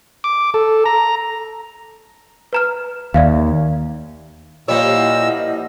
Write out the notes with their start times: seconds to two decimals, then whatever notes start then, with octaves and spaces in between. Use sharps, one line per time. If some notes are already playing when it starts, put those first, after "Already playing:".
0.24 D6
0.54 A4
0.86 A#5
2.53 B4 A#5 F6
3.14 D#2 D5 E5 F5
4.68 A#2 F3 G3 C#5 D#5 E6
4.93 E4 E5 F#5